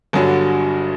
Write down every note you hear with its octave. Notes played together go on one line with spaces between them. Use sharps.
G1 G2 D3 F#3